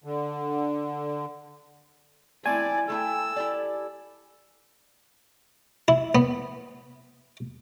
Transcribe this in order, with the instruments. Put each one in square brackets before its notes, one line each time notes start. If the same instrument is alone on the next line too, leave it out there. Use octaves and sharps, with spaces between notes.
[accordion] D3
[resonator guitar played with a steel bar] A3 C4 [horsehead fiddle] E4 D5 [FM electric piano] G#5
[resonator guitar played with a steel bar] A3 E4 G5 [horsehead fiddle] A4 [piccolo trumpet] E6
[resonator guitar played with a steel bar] E4 G4 D5
[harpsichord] E4
B3